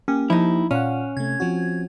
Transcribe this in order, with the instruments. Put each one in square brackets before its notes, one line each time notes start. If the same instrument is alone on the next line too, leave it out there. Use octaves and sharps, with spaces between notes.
[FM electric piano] A#3 G4 [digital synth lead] C#4
[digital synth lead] F3 [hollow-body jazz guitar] D#4 E4
[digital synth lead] A#2 [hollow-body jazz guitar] C#4 [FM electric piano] F5 F#5
[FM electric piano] C3 A3 [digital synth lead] G#6
[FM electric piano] F3 C4 F#4